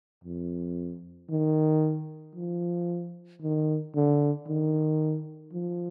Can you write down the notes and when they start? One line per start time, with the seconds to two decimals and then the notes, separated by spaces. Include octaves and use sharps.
0.24 F2
1.30 D#3
2.35 F3
3.42 D#3
3.95 D3
4.47 D#3
5.53 F3